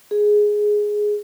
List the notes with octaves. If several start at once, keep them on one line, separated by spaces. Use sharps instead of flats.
G#4